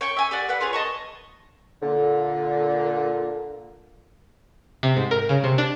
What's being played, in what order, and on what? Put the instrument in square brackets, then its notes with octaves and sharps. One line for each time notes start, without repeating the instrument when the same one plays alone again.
[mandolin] C#5 G5 C#6
E5 G#5
G4 D5 F#5
B4 F#5
F4 G#4 B4 C#5
D#5 A5 C#6
[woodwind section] A#2 D3
[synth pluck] C3
G#2
A#4
C#3
C3
D4